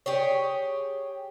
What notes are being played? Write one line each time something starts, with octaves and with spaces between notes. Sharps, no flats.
G4 G#4 C#5